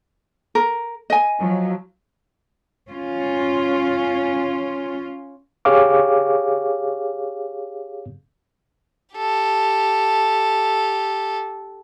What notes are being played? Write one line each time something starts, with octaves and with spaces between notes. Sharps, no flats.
A#4
D#5 G#5
F3 F#3
C#4 F4
G4 G#4 C#5 F5 D6
G4 A4